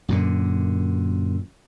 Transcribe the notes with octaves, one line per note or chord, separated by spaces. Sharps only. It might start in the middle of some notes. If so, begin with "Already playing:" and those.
F#2 A#2 D3